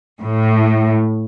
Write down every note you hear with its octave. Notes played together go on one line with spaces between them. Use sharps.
A2